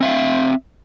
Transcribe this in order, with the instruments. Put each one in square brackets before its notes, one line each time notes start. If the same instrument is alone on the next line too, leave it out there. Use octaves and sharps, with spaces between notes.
[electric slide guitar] C4 E5 F5